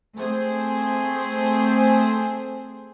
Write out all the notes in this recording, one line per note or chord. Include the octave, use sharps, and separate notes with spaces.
A3 C4 G#4 C5